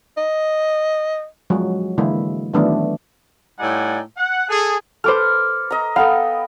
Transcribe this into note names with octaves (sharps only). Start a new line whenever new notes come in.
D#5
F3 F#3 G#3 F#4
D3 E3 G#3 A#3 E4
D#3 E3 F#3 A3 B3 D4
A2 G3 D#4 D5 F#5 G#5
F#5
G#4 A4
A4 B4 C5 D6 F6
D#5 A#5
B3 A4 F5 G5